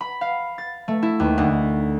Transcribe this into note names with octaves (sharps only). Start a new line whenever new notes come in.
B5
F5
A6
A3
E4
D#2
D2